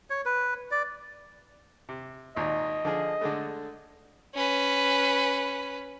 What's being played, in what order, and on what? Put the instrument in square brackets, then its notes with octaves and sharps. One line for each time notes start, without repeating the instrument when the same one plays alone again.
[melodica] C#5
B4
D5
[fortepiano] C3
[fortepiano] G#1 D#2 A#2 [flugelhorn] D#5
[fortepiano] D3 F3 G#4
D3 G#3 A3
[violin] C#4 B4